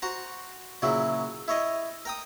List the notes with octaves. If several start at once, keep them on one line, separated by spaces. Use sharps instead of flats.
F#4 C5 A#5
A#2 C#3 F#3 E4
E4 C#5 D#5
A#4 G5 D#6